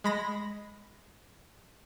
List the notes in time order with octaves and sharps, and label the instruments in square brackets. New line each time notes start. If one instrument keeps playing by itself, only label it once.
[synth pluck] G#3 B5 A#6